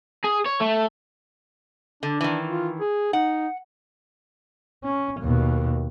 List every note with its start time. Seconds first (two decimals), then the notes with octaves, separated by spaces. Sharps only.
0.24 G#4
0.46 C#5
0.61 A3
2.03 D3 D4
2.21 D#3 E3
2.47 F4
2.80 G#4
3.13 D#4 F#5
4.84 C#4
5.20 D#2 B2